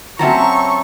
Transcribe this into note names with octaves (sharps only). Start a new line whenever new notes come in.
F#3 C4 C#4 E5 A5 A#5 C#6